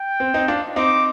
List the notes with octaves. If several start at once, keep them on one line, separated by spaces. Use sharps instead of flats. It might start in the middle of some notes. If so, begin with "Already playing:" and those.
Already playing: G5
C4
C4 D#4
D4 F4
C4 D#4 D6